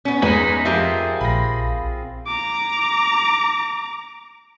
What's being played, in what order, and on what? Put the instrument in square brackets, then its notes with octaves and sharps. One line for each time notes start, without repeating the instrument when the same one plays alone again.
[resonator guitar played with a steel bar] B3 C#4
[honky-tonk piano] E2 B4 F#7 [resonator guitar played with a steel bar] G#3 G#4 [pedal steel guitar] C#4 D#4 [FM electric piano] B6
[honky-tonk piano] F2 [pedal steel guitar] C4 F4 G#4 [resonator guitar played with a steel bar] G4 A#4 E5
[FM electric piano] A#1 [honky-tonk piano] B5 A#6
[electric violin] A#5 D6